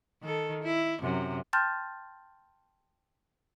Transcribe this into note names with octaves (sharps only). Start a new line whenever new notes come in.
D#3 A4
E4
F#2 C3
G5 A5 C6 F6 G6 A6